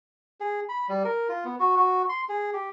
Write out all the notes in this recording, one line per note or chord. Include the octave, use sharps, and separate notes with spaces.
G#4
B5
G3
A#4
F4
B3
F#4
F#4
C6
G#4
G4